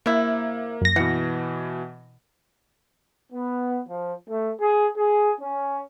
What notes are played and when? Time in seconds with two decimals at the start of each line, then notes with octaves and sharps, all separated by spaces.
0.06 C3 A#3 E4
0.81 F#2 A#6
0.96 B2 E3 F5 F#5
3.32 B3
3.89 F3
4.29 A3
4.61 G#4
4.97 G#4
5.40 C#4